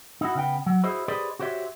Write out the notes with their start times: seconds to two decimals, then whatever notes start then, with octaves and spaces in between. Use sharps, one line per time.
0.21 D#4 E4 F#4
0.35 C#3 B3 F#5 G5
0.66 F#3
0.83 E4 F#4 G#4 C5 D#5
1.08 G4 G#4 B4 C5 D5 D#5
1.40 F#4 G4 C5 C#5 E5